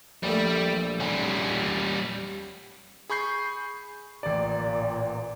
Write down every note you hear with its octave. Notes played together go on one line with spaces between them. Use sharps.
A#1 G3 A3
G3 C#4
G#4 B5 C#6 G6 C7
A1 A#2 D5